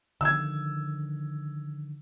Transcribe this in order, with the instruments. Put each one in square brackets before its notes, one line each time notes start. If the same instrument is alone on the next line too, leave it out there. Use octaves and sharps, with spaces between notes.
[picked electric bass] D3 D#3 F3 [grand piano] E6 G#6